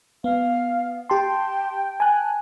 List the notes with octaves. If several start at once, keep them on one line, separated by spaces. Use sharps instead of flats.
B3 F5
G4 G5 A5 C6
G#5 A5 F#6